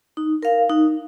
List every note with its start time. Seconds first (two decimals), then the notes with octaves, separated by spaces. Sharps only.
0.17 D#4
0.42 A#4 F5
0.70 D#4